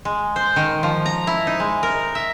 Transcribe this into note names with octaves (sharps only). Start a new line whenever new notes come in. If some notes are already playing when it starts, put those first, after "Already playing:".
G#3
C5
D#3
F3
A#5
E4
D#4
G#3
A#4
E5